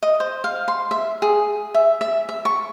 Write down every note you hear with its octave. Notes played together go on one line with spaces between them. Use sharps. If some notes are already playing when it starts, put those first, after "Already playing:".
D#5
C5
F5
C6
E5
G#4
E5
E5
E5
C#6